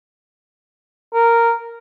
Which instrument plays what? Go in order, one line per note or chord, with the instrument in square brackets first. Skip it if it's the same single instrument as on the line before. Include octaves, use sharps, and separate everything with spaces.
[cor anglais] A#4